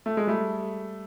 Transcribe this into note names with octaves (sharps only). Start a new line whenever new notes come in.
A3
G#3
G3 A3